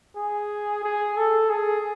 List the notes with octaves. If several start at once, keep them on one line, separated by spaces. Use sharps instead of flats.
G#4
G#4
A4
G#4